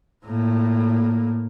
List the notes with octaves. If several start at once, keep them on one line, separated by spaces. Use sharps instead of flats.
A2 A#3